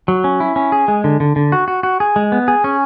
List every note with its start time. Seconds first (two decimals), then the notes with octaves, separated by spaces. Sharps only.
0.08 F#3
0.24 C#4
0.40 E4
0.56 C#4
0.72 G#4
0.88 G#3
1.04 D3
1.20 D3
1.36 D3
1.52 F#4
1.68 F#4
1.83 F#4
2.00 G#4
2.16 G#3
2.32 B3
2.48 G#4
2.64 C#4